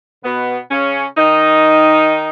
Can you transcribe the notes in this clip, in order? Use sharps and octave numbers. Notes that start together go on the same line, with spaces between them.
B2 B3
C#3 C#4
D#3 D#4